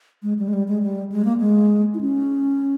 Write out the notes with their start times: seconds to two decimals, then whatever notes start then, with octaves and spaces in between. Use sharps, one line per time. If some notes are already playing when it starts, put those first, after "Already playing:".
0.23 G#3
0.39 G3
0.48 G#3
0.53 G3
0.68 G#3
0.82 G3
1.12 G#3
1.25 A#3
1.38 G#3
1.94 E4
2.01 C#4